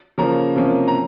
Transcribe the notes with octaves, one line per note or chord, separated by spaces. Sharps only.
C#3 F3 A#3 C#4 A#5
C3 F3 A#3 C#4
A#5